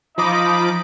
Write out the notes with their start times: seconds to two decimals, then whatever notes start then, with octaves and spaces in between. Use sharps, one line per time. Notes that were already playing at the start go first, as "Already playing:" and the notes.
0.18 F3 D#4 D#5 B5 D6